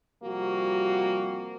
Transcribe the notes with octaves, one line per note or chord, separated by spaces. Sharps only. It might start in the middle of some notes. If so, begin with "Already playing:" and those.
C3 F3 G3 A#3 F#4